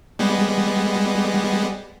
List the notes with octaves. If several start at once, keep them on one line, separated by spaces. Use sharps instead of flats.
G3 G#3 B3